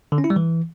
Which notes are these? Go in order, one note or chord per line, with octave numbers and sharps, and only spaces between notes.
D3
C#4
E4
G3
E3